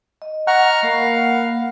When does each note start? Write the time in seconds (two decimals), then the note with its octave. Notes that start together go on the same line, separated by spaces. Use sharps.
0.22 D#5
0.47 F#5 A#5 C#6 F6
0.83 A#3 A#4 F5 B5